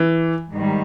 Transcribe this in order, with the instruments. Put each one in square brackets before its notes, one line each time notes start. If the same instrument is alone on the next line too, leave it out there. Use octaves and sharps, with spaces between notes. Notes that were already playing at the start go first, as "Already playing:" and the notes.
Already playing: [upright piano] E3
[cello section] G#2 D#3 G3